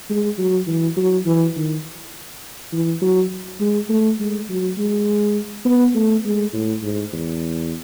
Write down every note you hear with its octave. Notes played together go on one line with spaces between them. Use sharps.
G#3
F#3
E3
F#3
E3
D#3
E3
F#3
G#3
A3
G#3
F#3
G#3
B3
A3
G#3
A2
G#2
E2